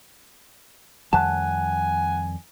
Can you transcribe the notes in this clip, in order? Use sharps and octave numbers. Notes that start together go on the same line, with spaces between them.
F2 D#3 G3 F#5 G#5 A5 F#6